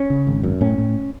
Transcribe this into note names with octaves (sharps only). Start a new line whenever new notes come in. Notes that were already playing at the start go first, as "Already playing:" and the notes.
Already playing: C#4
C#3
G#1
F#2
A2 C#4
A2